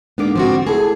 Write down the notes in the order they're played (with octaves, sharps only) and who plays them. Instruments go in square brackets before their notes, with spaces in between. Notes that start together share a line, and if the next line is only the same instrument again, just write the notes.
[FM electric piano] G#2 D3 D6 [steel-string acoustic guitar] A#3 B3
[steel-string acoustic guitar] F3 C4 F#4
[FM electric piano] A3 E4 A4 [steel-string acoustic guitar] G#4